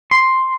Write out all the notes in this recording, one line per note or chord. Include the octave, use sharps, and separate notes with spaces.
C6